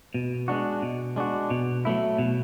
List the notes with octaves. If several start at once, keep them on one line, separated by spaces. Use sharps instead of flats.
B2
G#3 D4 F#4
B2
G#3 D4 F#4
B2
F#3 A3 E4
B2